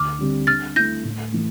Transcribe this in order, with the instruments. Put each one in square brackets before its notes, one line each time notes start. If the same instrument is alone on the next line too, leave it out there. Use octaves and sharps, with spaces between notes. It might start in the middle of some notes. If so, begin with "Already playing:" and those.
Already playing: [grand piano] D2 [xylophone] D6 F6
[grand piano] D3 G3 C4 G4
[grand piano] D3 [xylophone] F6 A6
[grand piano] A3 E4 [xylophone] G6 A#6
[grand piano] A2
E3 A3